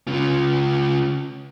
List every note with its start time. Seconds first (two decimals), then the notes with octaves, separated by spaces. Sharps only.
0.07 C#3 F4